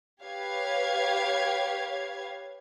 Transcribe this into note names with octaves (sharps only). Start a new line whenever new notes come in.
G4 B4 C#5 F5 G#6